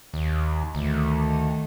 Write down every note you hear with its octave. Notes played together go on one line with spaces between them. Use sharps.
D#2
D2 D#3 A3